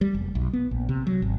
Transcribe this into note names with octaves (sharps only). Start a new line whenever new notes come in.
G3
F1
B1
B3
A#1
C3
F#3
G#1